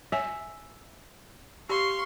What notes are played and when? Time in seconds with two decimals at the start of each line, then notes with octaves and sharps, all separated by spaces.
0.12 C#5 E5 G#5
1.69 G4 F5 C6 C#6